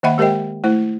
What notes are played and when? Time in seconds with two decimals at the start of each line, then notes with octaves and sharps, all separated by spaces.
0.03 D#3 A#3 D#5 E5 F#5 B5
0.18 G#3 G4 A#4 C5 D#5 G5
0.64 A3 E4 C5